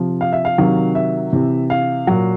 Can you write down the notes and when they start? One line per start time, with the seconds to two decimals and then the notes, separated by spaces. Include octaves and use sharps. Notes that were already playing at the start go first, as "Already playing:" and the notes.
Already playing: C3 F3
0.21 F5
0.33 E5
0.45 F5
0.58 C3 D#3 F#3
0.95 E5
1.33 C3 E3
1.70 F5
2.07 A#2 F#3